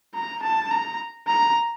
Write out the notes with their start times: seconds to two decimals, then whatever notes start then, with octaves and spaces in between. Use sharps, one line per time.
0.14 A#5
0.43 A5
0.71 A#5
1.27 A#5